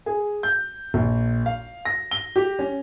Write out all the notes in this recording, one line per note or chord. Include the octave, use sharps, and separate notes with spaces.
G#4
G6
A#1
F5
A#6
G7
G4
C#4